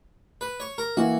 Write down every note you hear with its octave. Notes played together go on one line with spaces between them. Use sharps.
B4
C#5
A#4
E3 A#3 E4 F#4